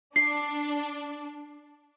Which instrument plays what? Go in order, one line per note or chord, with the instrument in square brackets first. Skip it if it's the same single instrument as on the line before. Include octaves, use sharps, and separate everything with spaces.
[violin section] D4 [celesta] C7